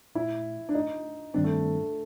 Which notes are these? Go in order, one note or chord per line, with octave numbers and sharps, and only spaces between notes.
A#2 F3 A3 E4
D4
D#4
G2 D#3 G3 C4 D4
A3